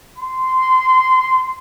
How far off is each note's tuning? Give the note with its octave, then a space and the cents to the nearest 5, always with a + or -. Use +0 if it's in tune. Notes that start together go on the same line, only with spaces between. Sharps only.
C6 -15